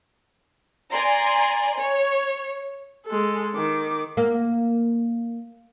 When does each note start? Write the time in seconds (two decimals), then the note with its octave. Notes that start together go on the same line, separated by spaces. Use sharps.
0.92 D5 G#5 A#5 C6
1.76 C#5
3.06 G#3 A4
3.55 D#3 D6
4.17 A#3